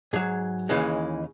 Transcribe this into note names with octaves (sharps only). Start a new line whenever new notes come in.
G#2 F#3 G#4
D#2 C#3 E3 G#3